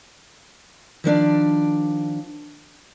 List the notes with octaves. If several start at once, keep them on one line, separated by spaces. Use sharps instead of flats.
D#3 F3 D4 D5